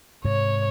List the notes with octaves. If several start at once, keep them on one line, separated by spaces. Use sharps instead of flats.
G#2 C3 C#5